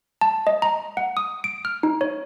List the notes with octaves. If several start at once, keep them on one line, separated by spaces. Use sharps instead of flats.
A5
D#5
A#5
F#5
D#6
D7
F6
D#4
C#5